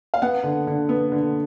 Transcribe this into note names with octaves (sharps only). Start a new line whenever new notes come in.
F5
B3 F#5
D3
D3
B3
D3